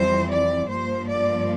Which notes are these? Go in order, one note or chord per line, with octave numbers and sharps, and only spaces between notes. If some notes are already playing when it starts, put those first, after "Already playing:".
Already playing: F2 E3 G3 C4 C5
D5
G2 F3 A#3 C5
D5